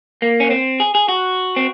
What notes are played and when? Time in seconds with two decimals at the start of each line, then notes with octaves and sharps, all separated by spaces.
0.22 A#3
0.40 C#4
0.50 C4
0.80 G#4
0.95 G#4
1.08 F#4
1.56 C4